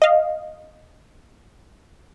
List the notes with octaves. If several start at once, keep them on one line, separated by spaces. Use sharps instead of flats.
D#5 F5